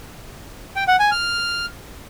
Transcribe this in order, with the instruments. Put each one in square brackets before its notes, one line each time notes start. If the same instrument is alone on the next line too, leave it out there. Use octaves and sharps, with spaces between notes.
[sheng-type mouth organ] G5
F#5
G#5
F6